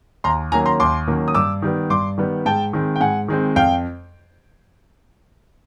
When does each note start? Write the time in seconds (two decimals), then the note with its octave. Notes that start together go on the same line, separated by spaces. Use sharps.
0.24 D#2 A#5 C6
0.52 D#3 F#3 A#3 C#4 G#5 A#5
0.66 A#5 C6
0.80 D#2 C6 D6
1.07 D#3 F#3 A#3 C#4
1.28 D#6
1.35 G2 D6 E6
1.62 D#3 G3 B3
1.90 G2 C6 D6
2.18 D#3 G3 B3
2.46 G#2 G5 A5
2.73 D#3 G#3 C4
2.96 G5
3.01 G#2 F#5 G#5
3.28 D#3 G#3 C4
3.56 F2 F5 G5